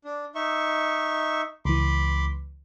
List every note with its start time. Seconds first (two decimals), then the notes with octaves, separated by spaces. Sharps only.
0.05 D4
0.35 D#4 E5 C#6
1.65 C#2 E3 B5 C6 D6